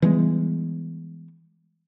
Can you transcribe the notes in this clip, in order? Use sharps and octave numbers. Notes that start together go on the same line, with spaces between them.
E3 G3 G#3 B3